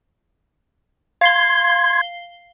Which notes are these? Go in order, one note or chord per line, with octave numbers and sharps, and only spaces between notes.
F5 C6 G#6 C7 G7